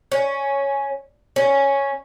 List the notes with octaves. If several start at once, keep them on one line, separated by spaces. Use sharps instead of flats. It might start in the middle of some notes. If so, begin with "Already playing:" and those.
C#4
C#4